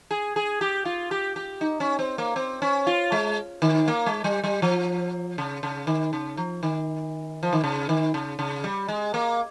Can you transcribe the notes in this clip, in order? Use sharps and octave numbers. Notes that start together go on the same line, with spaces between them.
G#4
G#4
G4
F4
G4
G4
D#4
C#4
C4
A#3
C4
C#4
F4
G#3
D#3
A#3
G#3
G3
G3
F3
C#3
C#3
D#3
C#3
F3
D#3
F3
D#3
C#3
D#3
C#3
C#3
G3
G#3
A#3